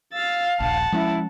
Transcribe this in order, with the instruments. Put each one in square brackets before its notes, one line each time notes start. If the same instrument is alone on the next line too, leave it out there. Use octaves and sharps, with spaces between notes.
[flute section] F5 [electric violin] E6 A6
[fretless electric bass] D#1 A#1 [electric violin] F#5 A5
[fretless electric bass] F3 G#3 C#4 [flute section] E4